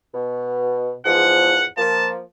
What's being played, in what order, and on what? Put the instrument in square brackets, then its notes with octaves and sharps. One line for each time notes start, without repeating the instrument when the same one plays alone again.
[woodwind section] B2
[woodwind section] E2 G#2 F3 [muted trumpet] F#5
[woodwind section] F3 A#3 [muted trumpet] A5